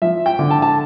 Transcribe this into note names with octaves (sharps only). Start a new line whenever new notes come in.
F3 E5
G5
D3
A5
A5